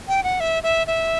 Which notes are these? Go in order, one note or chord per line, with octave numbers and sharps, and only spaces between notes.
G5
F#5
E5
E5
E5